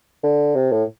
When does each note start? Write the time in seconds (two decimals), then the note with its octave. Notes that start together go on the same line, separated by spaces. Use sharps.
0.23 D3
0.55 C3
0.72 A2